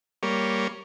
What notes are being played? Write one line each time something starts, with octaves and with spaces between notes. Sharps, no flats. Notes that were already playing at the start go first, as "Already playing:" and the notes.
G3 A#3 C#5